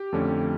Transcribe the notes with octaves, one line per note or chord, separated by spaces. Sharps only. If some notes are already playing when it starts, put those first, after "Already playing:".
Already playing: G4
F2 D3 A3 C#4